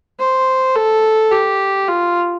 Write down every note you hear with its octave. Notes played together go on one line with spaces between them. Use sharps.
C5
A4
G4
F4